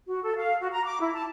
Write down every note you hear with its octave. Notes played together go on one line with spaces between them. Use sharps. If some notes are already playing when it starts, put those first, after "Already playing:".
F#4
A4
F5
F#4
A#5
D6
E4
A5